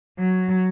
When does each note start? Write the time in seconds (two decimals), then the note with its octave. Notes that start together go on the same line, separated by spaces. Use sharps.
0.19 F#3